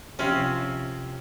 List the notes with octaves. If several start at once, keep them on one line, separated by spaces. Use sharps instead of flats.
C3 F3 C4 C#4